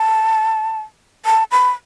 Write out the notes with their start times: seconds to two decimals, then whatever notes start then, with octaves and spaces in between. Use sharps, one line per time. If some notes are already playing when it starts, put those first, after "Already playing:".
Already playing: A5
1.26 A5
1.52 B5